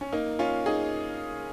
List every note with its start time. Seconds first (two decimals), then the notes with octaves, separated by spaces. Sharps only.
0.01 C#4
0.12 A#3 D#4
0.39 C#4 F4
0.66 D#4 G#4